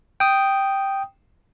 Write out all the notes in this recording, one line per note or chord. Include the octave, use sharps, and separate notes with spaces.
G5 D#6